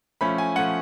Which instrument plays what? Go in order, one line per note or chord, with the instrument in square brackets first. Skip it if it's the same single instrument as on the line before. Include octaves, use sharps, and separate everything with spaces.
[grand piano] F3 A3 C#4 B5
G#5
F3 A3 C#4 F#5